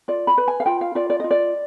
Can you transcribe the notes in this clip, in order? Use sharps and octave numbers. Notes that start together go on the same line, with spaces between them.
F4 D5
B5
B4
G#5
F5
F4 G5
F5
F4 D5
D5
F4 D#5
D5